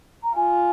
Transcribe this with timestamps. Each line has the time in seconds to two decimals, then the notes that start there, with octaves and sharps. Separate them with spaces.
0.23 A#5
0.35 F4 G#5